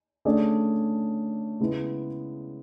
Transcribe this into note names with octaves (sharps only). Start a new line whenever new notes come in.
D3 A3 C#4 G#4 D5
C#3 G#3 B3 E4